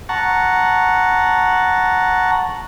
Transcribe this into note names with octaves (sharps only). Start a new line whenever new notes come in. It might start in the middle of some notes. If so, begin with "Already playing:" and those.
F#5 A5 A#5 C#6